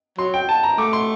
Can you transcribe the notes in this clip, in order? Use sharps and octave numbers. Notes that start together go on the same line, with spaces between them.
F#3 C6
G5
A5
A#5
A3 D6
C6